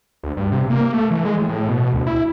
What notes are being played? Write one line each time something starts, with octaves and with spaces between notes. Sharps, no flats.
D2
G2
C3
A#3
A3
E3
G#3
A2
A2
B2
D2
E4